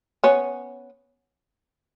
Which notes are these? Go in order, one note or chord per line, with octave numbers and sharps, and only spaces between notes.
B3 C#4